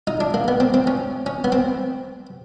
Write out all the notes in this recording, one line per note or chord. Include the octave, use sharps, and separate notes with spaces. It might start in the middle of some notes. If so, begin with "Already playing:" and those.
D#4
D4
A#3
B3
C4
C4
C#4
C#4
B3
C4